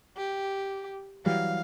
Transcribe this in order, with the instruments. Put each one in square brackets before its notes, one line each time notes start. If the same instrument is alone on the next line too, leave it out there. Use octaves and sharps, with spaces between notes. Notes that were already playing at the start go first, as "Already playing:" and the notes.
[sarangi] G4
[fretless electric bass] E3 F#3 G3 [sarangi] F5